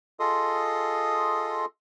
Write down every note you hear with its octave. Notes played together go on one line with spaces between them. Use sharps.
F4 G#4 A4 D#5 C6 D#6